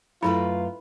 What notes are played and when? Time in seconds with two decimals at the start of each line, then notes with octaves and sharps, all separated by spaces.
0.23 F#2 A3 E4 F4 A4 B4 B5